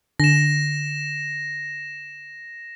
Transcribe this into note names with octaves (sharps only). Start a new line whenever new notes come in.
D3 A#6 E7